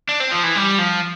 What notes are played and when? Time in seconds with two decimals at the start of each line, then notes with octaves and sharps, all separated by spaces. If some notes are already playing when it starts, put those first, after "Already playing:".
0.09 D4
0.20 C4
0.31 F3
0.43 E3
0.55 G3
0.78 F3